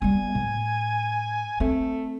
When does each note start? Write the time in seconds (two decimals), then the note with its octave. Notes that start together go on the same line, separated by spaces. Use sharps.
0.02 G3 B3 G#5
0.35 A2
1.60 A3 C4